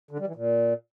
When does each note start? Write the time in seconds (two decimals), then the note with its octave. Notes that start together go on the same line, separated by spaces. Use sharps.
0.11 D3
0.19 G3
0.27 E3
0.35 A#2